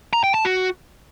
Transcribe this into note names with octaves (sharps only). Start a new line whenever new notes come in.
A#5
G5
A5
F#4